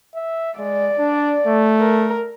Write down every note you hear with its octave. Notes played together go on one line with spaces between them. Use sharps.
E5
G#3 D5
D4
A3
A#4